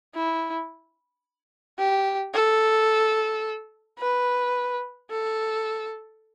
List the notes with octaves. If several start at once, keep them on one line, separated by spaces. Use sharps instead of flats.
E4
G4
A4
B4
A4